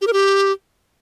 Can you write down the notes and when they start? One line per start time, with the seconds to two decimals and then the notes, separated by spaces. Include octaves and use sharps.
0.01 G4
0.07 A#4
0.13 G4